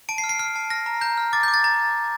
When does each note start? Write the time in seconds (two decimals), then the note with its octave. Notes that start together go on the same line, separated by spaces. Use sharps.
0.09 A5 D7
0.18 C7
0.24 F6
0.29 C7
0.39 F6 C7
0.56 A5
0.70 F6 A#6
0.86 A#5
1.01 A#5 G6
1.17 F6
1.33 D6 A6
1.43 D6 G6
1.54 A6
1.64 A#5 A6